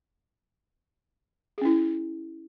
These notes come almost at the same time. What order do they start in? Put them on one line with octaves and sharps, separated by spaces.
G#4 C#4 E4